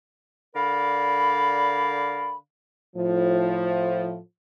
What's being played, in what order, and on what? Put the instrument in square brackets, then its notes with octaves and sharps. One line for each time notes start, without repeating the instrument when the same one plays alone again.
[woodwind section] D3 A#4 D5 F5 B5
[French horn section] A2 F3